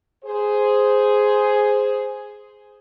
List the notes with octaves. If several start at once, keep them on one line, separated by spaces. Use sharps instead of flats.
G#4 C5